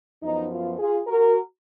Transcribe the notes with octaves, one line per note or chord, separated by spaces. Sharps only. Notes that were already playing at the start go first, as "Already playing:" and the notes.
F#2 F3 B3 D#4
F4
F4 G#4
F#4 A#4